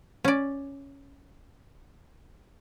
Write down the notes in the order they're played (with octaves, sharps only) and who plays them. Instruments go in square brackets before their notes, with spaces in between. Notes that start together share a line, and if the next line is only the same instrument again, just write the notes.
[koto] C#4 D5